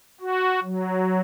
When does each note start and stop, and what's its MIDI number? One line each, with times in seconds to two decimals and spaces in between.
0.21 0.60 66
0.63 1.21 54